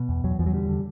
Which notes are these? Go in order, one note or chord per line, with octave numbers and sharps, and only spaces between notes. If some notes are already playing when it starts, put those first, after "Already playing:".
Already playing: B2
E2
E2 F#3
E2 F3
F#3
D3 G3
D3